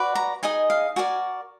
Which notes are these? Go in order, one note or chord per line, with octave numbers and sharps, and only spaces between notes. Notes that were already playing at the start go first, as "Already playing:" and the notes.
Already playing: F#4 B4 D5
A#5
D#4 G#4 D#5 G#5
F5
F#4 A#4 D5 G#5